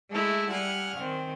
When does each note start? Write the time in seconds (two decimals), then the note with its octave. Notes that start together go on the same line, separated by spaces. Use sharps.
0.11 G#3 A3 E4
0.52 G3 F#5 G#5 F6
0.98 D#3 C4